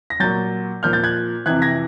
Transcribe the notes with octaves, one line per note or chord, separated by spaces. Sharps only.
A#6
A#2 F#3 G6 A6
A#2 F3 F6 G6
G6 A6
F#6 G#6
F2 C3 E3 F#6 G#6
G#6 A#6